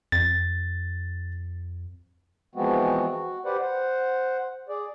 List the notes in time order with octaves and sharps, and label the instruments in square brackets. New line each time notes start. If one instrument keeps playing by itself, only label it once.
[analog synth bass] F2 [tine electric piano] A6
[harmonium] E3 F3 G#3 B3 C4 F#4
F#4
G4 B4 C5 D5 F#5
C5 F#5
G#4 D5